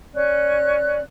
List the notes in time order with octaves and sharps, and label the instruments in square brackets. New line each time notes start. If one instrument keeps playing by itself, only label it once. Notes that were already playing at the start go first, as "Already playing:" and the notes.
[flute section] C#4 D5 F#6